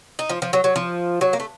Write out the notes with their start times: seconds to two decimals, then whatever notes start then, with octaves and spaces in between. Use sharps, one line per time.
0.19 D#4
0.29 F3
0.42 F3
0.53 F#3
0.64 F#3
0.76 F3
1.21 F#3
1.33 A#3
1.40 A3